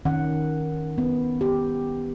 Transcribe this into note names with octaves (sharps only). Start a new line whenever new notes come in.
D#3 C#4 F#5
B3
G4